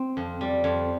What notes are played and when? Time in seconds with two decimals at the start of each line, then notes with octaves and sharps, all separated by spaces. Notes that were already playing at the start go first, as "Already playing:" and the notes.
Already playing: C4
0.17 F2
0.41 G3
0.64 F2